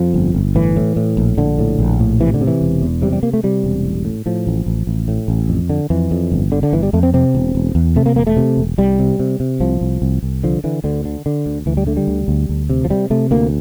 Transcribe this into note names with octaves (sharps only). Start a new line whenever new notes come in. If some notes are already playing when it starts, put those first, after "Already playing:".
Already playing: F2 F3
G1
G1
A2 E3
A2
A2
A#1
A#1 D3
A2
A#1
A2
C3 E3
D3
C3
E3
E1
E2
C3 G3
G3
C3 A#3
A3
C3 G3
E1
A1
A2
A2 F3
A1
A1
A1
A2
A1
F2
D3
F2 E3
F2
G1
D3
D3
G1 E3
G3
F2 A3
C4
C3 C4
E1
E1
E2
C3 A3
A#3
E1 A#3
A3
C3
E1
C2 G3
C3
C3
C3
C2 F3
C2
C2
C2
D3 F3
D3 E3
D2 D3
D3
D3
D2
D2 E3
G3
D3 A3
G3
D2
D2
D2
C3
F3
C3 G3
C3 A3
D2 A#3